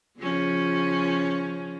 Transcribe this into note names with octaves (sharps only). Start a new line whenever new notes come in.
C#3 F3 C#4